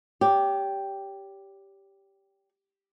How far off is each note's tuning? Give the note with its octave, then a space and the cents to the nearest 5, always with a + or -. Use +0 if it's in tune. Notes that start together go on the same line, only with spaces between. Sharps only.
G4 +0 C#5 +40